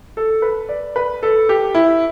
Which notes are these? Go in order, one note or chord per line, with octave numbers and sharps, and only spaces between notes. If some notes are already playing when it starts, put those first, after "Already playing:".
A4
B4
D5
B4
A4
G4
E4